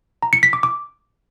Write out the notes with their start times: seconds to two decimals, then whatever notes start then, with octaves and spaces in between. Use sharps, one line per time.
0.22 A#5
0.33 C#7
0.43 B6
0.53 D6
0.63 D6